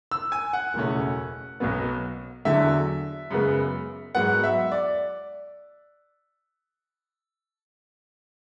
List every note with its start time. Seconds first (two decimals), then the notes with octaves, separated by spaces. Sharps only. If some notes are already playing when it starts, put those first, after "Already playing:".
0.11 E6
0.32 G#5
0.53 F#5
0.74 F#1 E2 B2 A3 C#4
1.60 B1 B2 F#3 B3
2.45 E2 D3 F#3 E5
3.31 F#2 C#3 G#3 B3
4.15 G#2 F#3 B3 F#5
4.44 E5
4.72 D5